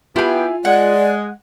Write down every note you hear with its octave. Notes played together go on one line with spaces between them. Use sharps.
B3 E4 F4 G4 G#4 G#5
G#3 D5 F#5